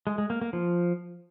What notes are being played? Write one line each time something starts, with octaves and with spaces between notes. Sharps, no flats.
G#3
G#3
A#3
A#3
F3